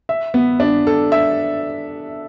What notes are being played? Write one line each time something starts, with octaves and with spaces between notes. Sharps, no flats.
E5
B3
D4
A4
E5